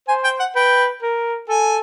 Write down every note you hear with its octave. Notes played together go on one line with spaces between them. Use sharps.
C5 G#5
G5
F#5
B4 G5
A#4
A4 G#5